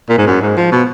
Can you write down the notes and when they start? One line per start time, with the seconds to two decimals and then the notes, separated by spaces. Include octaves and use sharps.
0.09 A#2
0.18 G#2
0.27 F#2
0.42 G#2
0.57 F3
0.72 B2